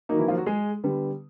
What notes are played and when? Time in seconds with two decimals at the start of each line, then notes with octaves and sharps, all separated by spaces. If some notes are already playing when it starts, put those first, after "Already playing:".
0.09 D#3 F#3 A#3 D#4
0.18 E3 E4
0.28 F3 F4
0.37 F#3 F#4
0.46 G#3 G#4
0.84 D3 G3 B3